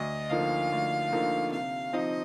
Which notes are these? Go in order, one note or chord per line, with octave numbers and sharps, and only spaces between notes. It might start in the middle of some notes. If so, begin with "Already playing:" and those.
Already playing: D2 D#5
D3 F3 A#3 D#4 F5
D2
D3 F3 A#3 D#4
C3 F5
F3 C4 D#4 D#5